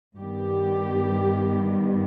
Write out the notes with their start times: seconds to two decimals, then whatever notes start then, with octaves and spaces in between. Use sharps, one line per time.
0.17 G2 D#3 G3 B3 G4